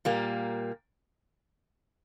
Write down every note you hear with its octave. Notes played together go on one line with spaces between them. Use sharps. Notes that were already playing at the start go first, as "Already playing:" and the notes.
A#2 G3 A#3